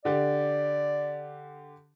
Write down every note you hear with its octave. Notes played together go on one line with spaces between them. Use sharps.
D3 G4 D5